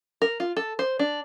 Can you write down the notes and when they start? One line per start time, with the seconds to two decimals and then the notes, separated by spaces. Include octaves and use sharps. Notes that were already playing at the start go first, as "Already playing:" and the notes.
0.22 A#4
0.40 F4
0.57 A4
0.79 C5
0.99 D4